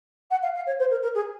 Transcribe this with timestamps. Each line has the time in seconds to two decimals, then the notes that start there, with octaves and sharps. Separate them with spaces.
0.30 F#5
0.42 F5
0.55 F5
0.66 C#5
0.79 C5
0.90 A#4
1.02 A#4
1.14 G#4